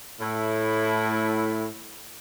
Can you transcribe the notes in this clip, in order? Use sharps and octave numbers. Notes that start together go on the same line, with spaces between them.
A2 E4